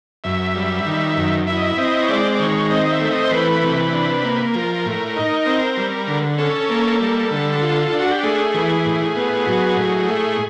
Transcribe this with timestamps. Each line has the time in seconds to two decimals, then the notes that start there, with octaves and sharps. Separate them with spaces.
0.24 F#2 E5
0.55 G3
0.85 D#3
1.16 F#2
1.47 E4 E5
1.57 D#5
1.67 E5
1.77 C4 D#5
2.02 C#5
2.09 G#3 D5
2.34 D5
2.39 D#3 C#5
2.70 C4 D#5
2.86 D#5
2.91 E5
3.00 A3
3.11 D#5
3.24 C5
3.31 E3 B4
3.63 C3
3.92 D4
4.23 A#3
4.54 F3 A#4
4.86 A2
5.16 D#4
5.46 C4
5.77 G3
6.07 D3
6.38 C#4 A4
6.69 A#3
7.00 G3
7.31 D3
7.61 F4
7.88 D4 F4
8.00 F#4
8.11 G4
8.23 A3 G#4
8.54 E3
8.85 A2
9.16 B3
9.47 F#3
9.76 A2
10.08 A3